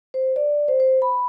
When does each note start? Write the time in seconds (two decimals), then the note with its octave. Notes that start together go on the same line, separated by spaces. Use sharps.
0.14 C5
0.36 D5
0.68 C5
0.80 C5
1.02 B5